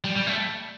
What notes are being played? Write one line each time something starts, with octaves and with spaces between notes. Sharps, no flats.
G3
G3
A3